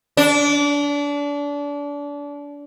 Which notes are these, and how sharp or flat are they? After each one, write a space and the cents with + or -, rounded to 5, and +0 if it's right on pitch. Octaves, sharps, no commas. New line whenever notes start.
D4 -30